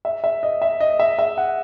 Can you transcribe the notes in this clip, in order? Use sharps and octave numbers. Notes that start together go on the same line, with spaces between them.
E5
E5
D#5
E5
D#5
E5
E5
F#5